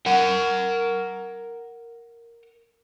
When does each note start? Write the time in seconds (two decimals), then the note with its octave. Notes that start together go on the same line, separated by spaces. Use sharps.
0.06 A#4 F#5